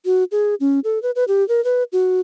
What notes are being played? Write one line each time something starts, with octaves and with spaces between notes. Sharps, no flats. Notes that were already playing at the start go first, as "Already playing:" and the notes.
F#4
G#4
C#4
A4
B4
B4
G4
A#4
B4
F#4